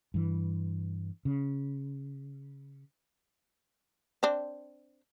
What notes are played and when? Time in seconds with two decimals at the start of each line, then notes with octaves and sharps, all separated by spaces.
0.14 G2 E3
1.25 C#3
4.23 C4 D4